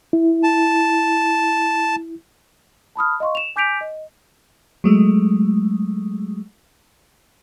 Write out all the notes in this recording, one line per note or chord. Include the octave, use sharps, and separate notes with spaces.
E4
A5
A5 B5 D#6 F6
D#5 F5 C6 C#6
E7 F7
G#5 D6 G6 B6 D7 F7
D#5
F#3 G#3 A3